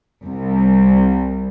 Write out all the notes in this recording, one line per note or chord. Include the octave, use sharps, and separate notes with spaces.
C2